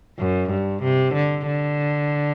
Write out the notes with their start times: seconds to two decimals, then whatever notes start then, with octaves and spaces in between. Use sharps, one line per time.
0.19 F#2
0.50 G2
0.82 C3
1.14 D3
1.46 D3